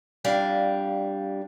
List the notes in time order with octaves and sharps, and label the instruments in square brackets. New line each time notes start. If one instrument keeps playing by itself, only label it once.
[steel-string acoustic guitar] F2 G3 D4 F5